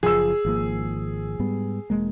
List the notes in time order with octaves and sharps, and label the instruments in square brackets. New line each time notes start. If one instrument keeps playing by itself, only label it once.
[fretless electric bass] F#1 F3 [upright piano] G#4 E6
[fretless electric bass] G#1 F3 A#3
G#2 G3 B3
E1 G#3 A#3